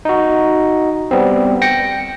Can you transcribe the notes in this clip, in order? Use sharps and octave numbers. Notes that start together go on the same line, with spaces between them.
D#4 F#4
G3 B3 C4
G5 A#6 C#7